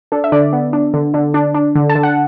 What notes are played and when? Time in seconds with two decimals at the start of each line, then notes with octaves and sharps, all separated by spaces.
0.12 D4 A4
0.24 E5
0.32 D3 D4 D5
0.53 B3
0.73 D4
0.94 D3
1.14 D3
1.34 D4
1.55 D4
1.75 D3
1.90 A5
1.95 D3
2.03 F#5